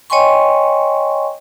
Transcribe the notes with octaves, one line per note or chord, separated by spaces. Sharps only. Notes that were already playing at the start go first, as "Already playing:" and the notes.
C#5 D#5 G5 G#5 C6 C#6